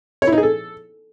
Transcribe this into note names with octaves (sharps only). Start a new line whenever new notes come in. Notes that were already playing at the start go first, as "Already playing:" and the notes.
C#5
E4
D#4
G#4
A4